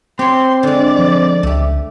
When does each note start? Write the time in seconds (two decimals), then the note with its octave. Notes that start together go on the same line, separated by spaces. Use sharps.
0.19 C4 G4 C#5 C6
0.63 D3 G#3 D5
0.99 F3
1.43 C#2 A3 G4